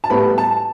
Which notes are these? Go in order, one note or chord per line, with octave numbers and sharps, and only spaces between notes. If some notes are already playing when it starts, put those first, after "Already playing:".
A5
A2 G3 B3 B5
A5